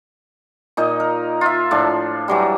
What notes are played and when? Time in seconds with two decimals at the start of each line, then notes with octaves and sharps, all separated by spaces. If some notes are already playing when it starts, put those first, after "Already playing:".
0.77 A#2 D#4 D#5
1.00 A#4
1.41 F4 E5
1.71 A2 F3 D4
2.28 E3 F#3 G3